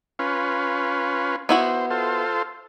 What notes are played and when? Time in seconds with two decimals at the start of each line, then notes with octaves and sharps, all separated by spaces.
0.19 C#4 F4 B4
1.49 B3 E4 F#4 C5
1.91 F4 A4 C5